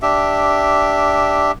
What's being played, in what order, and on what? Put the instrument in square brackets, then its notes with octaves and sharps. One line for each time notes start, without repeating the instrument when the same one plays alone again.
[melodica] D4 G4 E5